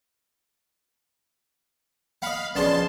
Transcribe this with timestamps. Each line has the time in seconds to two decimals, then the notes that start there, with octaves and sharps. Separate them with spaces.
2.22 D#5 F5 F#5 B5
2.55 A#1 F2 C#3 B3 D5 A5 C6